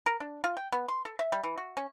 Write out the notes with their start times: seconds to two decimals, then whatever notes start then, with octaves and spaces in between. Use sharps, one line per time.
0.06 A#4
0.20 D4
0.44 F4
0.57 G5
0.72 B3
0.88 C6
1.05 A4
1.19 E5
1.32 G3
1.43 E3
1.58 F#4
1.77 C#4